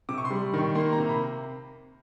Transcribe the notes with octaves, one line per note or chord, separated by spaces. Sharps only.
C3 D6
C#6
C6
G3
D#3 C#6
A#3 C6
A#5
C3
B5